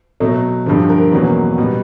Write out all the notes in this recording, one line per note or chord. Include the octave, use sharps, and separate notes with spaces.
B2 F#3 A3
G2 D3 F3
A#4
E2 B2 F#3 A#3 C#4 B4
B2 G3 B3